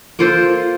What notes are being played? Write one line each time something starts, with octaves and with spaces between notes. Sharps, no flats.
A#3 F4 A4 C5